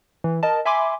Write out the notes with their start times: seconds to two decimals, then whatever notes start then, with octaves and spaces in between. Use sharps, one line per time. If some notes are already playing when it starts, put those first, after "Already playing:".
0.24 E3
0.43 A#4 D#5 A5
0.65 E5 G#5 B5 C6 D6